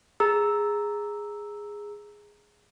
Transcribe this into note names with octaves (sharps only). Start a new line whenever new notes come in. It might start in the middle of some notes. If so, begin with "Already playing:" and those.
G#4 A#5 E6